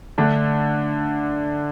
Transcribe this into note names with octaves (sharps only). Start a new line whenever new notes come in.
D3 A3 D4